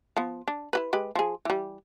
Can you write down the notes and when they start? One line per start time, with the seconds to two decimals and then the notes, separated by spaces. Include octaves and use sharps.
0.17 F3 B3
0.48 D4
0.73 E4 G4 B4
0.93 G#3 G4 B4
1.15 F3 G#4
1.45 E3 G3